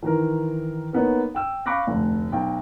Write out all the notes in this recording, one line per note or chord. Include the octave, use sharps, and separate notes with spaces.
D#3 E3 A#4
A#3 B3 D#4 C#5
G5 E6
F5 B5 C#6 D6 F#6 A#6
F1 D2
B1 G5